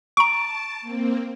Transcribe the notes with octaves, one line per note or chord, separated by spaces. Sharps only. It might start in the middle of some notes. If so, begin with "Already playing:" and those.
A5 A#5 C#6 D7
A#3 C4